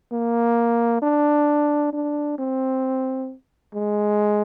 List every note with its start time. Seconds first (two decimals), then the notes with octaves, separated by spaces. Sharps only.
0.13 A#3
1.02 D4
1.93 D4
2.39 C4
3.75 G#3